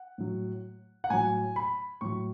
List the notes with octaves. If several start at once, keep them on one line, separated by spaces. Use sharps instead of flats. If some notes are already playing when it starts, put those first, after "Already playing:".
Already playing: F#5
A2 F#3
F#5
A2 F#3 G#5
B5
A2 F#3 C#6